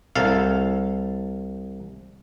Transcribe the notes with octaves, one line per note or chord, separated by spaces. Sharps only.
C2 A4 F5